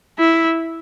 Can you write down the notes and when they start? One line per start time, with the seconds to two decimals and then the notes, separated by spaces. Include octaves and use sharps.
0.19 E4